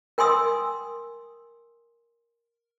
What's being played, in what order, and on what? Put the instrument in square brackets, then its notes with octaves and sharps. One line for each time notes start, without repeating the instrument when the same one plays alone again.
[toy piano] A#4 G5 G#5 C6 D#6 E6